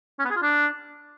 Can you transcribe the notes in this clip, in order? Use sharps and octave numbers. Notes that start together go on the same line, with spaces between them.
C#4
B3
G#4
F4
D4